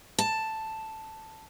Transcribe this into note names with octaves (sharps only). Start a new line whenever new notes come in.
A5